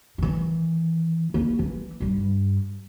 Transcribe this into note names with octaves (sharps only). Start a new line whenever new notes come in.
D#3 E3
A#3 E4
E3
G2 G3